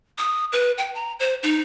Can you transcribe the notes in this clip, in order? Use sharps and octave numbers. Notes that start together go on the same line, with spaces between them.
D#6
B4
G5
A#5
C5
D#4